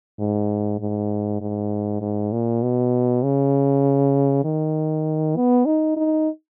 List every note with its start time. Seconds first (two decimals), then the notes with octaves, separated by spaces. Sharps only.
0.19 G#2
0.79 G#2
1.41 G#2
2.01 G#2
2.32 A#2
2.62 B2
3.23 C#3
4.44 D#3
5.36 B3
5.66 D#4
5.97 D#4